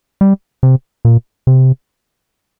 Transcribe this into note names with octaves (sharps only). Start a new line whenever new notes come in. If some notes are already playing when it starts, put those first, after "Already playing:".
G3
C3
A#2
C3